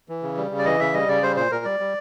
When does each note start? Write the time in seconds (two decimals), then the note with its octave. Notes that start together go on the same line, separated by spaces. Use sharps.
0.09 E3
0.23 C#3
0.37 G3
0.51 C#3
0.59 D5
0.65 E3 D#5
0.80 C#3 E5
0.94 G3 D#5
1.08 C#3 D5
1.23 G3 C5
1.36 A#2 C5
1.51 A#2 A#4
1.65 G3 D5
1.80 G3